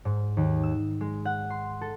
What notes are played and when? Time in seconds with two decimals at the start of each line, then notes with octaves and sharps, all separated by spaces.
0.05 G#2
0.37 D#2
0.63 E6
1.01 G#3
1.25 F#5
1.50 C6
1.81 A4